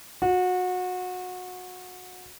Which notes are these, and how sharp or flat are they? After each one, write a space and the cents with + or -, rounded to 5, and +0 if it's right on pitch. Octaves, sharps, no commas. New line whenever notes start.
F#4 -25